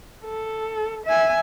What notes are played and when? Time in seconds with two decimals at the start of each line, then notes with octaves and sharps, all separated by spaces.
0.25 A4
1.06 E5 G#5